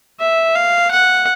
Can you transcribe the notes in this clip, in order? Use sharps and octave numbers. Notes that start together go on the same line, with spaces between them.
E5
F5
F#5